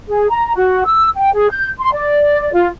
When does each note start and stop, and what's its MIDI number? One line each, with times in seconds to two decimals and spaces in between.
0.09 0.27 68
0.30 0.52 82
0.55 0.82 66
0.85 1.09 88
1.15 1.31 79
1.34 1.48 68
1.50 1.67 91
1.78 1.90 84
1.94 2.51 74
2.53 2.68 65